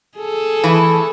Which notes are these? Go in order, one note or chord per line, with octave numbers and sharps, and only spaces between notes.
G#4 A4
E3 A3